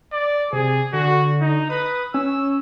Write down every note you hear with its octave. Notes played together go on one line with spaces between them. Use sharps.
D5
C3 G#4
D3 F#4
D#4
B4 D#6
C#4 E6